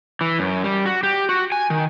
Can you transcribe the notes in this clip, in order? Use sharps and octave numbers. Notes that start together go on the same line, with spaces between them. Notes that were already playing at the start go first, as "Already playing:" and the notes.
E3
F#2
G3
F#4
G4
F#4
G#5
D#3